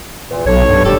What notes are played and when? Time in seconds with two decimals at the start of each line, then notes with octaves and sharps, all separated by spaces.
0.30 E2 A#2
0.46 B1 A4 C#5
0.69 G2
0.85 E1 G3 G4 A4